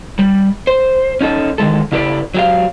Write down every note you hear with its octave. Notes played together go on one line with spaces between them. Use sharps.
G3
C5
C#4 D#4 A4
D#3 E3 G#3 A4
C#3 E4 G4 A4 B4 D5
F#3 G4 F5